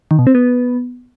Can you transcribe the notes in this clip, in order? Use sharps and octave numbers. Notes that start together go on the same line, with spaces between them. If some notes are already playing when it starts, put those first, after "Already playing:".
D#3
B2
C4
B3